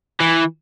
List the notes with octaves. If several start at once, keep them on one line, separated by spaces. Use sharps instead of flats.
E3